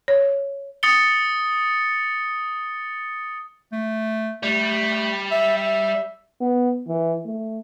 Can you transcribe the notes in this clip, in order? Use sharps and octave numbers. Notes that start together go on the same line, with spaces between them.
C#5
D#6 A6 C#7 G7
A3
G3 A3
E5
E5
B3
E3
A3